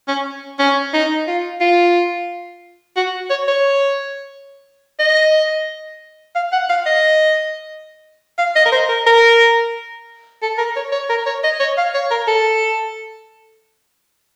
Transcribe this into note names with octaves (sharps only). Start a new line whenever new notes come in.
C#4
C#4
D#4
F4
F4
F#4
C#5
C#5
D#5
F5
F#5
F5
D#5
F5
D#5
A#4
C5
A#4
A#4
A4
A#4
C#5
C#5
A#4
C#5
D#5
C#5
F5
C#5
A#4
A4